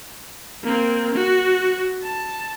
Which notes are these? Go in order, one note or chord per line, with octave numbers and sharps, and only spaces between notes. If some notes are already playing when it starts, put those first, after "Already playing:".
A#3 C4
F#4
A5